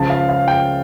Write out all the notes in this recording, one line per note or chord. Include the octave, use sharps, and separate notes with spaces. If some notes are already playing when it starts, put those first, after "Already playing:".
Already playing: C#2 C#3 F3 A5
F5
F5
G5